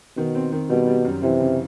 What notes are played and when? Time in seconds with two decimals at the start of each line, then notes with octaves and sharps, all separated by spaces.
0.16 B2 D#3
0.35 C4
0.52 D#3
0.70 B2 G3
0.87 G3
1.05 F#2
1.23 C3 E3
1.40 C#3